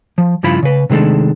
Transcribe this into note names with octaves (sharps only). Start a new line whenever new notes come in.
F3
G2 C#3 F3 E4 F4 B5
C#3 B4
C3 D#3 G#3 A3 D4